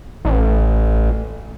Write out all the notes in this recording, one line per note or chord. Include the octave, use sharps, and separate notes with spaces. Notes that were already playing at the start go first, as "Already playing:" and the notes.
A1